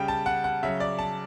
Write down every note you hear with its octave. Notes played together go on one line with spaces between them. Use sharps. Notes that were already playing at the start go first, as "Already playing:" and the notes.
Already playing: C#3 G3 G5
A5
F#5
F#5
C#3 F#3 E5
D5
A5